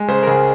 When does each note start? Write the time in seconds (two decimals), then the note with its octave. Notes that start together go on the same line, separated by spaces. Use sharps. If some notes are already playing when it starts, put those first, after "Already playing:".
Already playing: G#3
0.08 C#3 C5
0.23 A#4
0.27 C#2 G#4